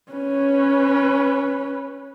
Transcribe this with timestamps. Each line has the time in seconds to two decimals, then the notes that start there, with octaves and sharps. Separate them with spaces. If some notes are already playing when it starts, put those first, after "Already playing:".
0.12 C#4 B4